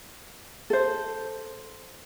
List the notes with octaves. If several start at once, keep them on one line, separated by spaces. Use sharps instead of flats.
A4 C5